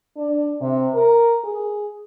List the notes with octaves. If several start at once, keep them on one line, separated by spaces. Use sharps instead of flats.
D4
C3
A#4
G#4